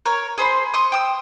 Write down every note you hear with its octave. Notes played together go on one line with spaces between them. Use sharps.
A#4 C#5
G#4 C5 B5 C6
C6 C#6 D#6
G5 D#6 E6